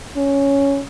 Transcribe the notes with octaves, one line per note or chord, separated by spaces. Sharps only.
C#4